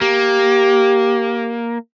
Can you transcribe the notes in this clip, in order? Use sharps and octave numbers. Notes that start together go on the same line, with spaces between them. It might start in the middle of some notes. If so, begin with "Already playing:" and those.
A#3 G4